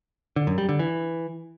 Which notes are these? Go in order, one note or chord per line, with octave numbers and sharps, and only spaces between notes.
D3
F#2
G3
D3
E3